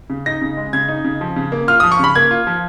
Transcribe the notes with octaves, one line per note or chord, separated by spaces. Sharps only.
C#3
D#4 A#6
C#3
G#3
C#3 G#6
D#4
C#3
F3
C#3
A#3
F4 F6
F3 D#6
C#6
C#3 B5
A#3 G#6
F4
F3